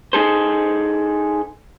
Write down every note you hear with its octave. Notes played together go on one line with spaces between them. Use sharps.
D#4 G#4 A4 C5